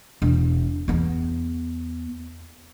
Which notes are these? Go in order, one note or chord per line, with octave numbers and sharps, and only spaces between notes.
E1
E2 B3